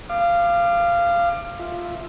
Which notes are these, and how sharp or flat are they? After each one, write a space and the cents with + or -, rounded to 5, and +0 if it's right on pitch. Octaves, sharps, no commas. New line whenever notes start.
F5 -15 D6 +25
F4 +0 E5 +0